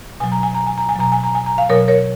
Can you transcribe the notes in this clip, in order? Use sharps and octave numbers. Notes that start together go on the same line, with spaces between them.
B2 F#3 G#5
A#5
G#5
A#5
G#5
A#5
G#5
B2 F#3 A#5
G#5
A#5
G#5
A#5
F5 G#5
B2 F#3 A#4 C#5
A#4 C#5